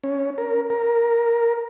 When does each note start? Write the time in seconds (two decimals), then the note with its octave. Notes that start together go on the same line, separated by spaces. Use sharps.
0.04 C#4
0.38 A#4
0.70 A#4